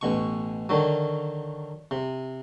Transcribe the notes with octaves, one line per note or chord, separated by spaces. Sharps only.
A1 B2 C#6
D3 D#3 F#3
C3